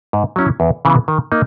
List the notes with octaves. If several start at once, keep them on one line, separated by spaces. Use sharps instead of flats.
G#2
F#3 C#4 E4
E2
C#3 E3 B3
D#3
A#3 D#4